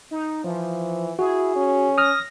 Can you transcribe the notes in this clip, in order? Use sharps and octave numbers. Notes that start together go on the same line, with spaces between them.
D#4
E3 F3
E4 F#4 G#4
C#4
D#6 F6 A#6